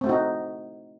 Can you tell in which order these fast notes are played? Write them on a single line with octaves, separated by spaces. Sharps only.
C4 A3 F#4 D#4